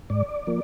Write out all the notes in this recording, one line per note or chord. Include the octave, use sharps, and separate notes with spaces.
G#2 D5
F3 A#3